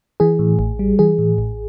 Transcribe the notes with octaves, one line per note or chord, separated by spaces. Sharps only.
E3 G#4
A2
A1
G3
E3 G#4
A2
A1